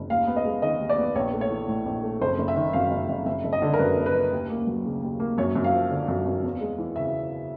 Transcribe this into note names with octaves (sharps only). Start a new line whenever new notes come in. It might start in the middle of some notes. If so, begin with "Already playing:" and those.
Already playing: F#1
D#2 F5
B3
D#5
G#3
D#3 D#5
D#2
D5
B3
A#1 C#5
A3
C#5
E3
A2
A#1
A3
F#1 C5
F#1
E5
D#3
F#2 F5
F#1
F#1
F#1 E5
F#1
D#5
D3
A#4
F#2 B4
F#1
B4
F#1
D#2
A#3
F#3
C#3
D#2
A#3
F#2 C#5
F#2
F5
F3
D3
F#2
F#2
E2
G#3
E3
C#3 E5